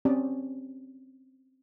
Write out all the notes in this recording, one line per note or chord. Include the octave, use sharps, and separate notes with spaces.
C4 C#4 G4 D5